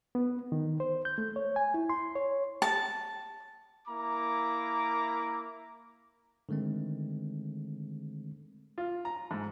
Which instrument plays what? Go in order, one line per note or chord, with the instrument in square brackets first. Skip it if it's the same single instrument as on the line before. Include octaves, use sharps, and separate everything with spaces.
[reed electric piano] B3
D#3
C5
G6
A3
C#5
G#5
E4
C6
C#5
[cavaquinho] A5
[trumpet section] A#3 E4 A#5 D6
[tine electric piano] D3 D#3 G#3 A3 C4
[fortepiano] F4
A#5
G#2